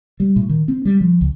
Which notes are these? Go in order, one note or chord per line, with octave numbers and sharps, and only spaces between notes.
G3
A2
D#3
C4
G3
F3
C#2